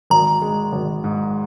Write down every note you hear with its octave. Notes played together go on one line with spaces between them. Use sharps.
G#1 A#5
G#3
G#1
G#2